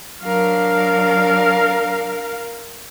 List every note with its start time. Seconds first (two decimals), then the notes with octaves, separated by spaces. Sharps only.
0.23 F#3 D4 A#4 F5